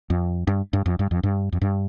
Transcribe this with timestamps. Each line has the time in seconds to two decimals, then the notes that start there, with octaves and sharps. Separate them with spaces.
0.10 F2
0.47 G2
0.73 G2
0.86 F2
0.99 G2
1.11 F2
1.23 G2
1.52 F2
1.61 G2